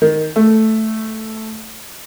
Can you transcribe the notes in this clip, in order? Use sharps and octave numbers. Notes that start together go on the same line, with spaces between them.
D#3
A3